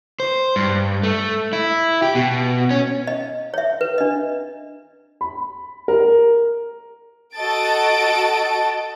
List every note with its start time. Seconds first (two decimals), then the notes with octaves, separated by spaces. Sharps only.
0.20 C5
0.56 G2
1.03 A3
1.53 E4
2.02 G4
2.15 B2
2.71 C#4
3.07 D#5
3.54 C#5 E5
3.81 B4
3.98 D4 D#5
5.21 B5
5.88 A#4
7.34 F#4 A4 D#5 A5 A6 D7